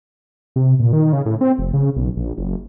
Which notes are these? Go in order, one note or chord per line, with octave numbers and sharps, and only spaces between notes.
C3
A#2
D#3
C#3
A2
C4
F1
C#3
B1
A#1
F#1